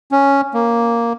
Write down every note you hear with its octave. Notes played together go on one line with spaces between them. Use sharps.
C#4
A#3